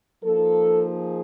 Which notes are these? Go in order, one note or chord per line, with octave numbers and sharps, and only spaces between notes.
F3 A#3 D#4 A4
G#4